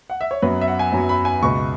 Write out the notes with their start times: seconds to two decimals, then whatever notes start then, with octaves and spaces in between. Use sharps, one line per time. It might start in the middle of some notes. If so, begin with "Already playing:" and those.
0.10 F#5
0.21 E5
0.31 C#5
0.42 F#2 F#3 B3 B4
0.61 E5
0.68 F#5
0.79 G#5
0.92 F#2 F#3 B3
1.09 B5
1.25 G#5
1.42 C#2 B2 B3 C#6